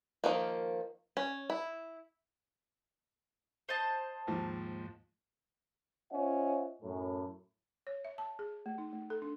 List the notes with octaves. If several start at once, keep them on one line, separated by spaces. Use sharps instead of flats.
D#3 F3 A#3
C#4
E4
C5 D#5 A5
D#2 G#2 F3
C#4 F4 C5 D#5 E5 F#5
F#2 A2
C#5
E5
A5
G#4
A3
D#4
A3
A4
D4